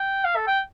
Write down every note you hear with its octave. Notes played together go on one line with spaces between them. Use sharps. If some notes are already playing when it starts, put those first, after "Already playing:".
Already playing: G5
F5
A4
G5